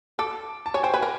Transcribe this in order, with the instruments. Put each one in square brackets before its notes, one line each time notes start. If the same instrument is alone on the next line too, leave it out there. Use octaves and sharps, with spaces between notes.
[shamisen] A4 [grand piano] D6
[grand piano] A5
[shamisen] C#5 [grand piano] G#5
[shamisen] C5 [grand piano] G5
[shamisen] B4 [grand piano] G#5
[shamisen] A#4